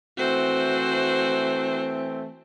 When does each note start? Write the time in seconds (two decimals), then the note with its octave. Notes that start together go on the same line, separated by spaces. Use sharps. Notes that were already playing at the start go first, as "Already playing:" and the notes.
0.17 E3 A3 C4 F#4 C5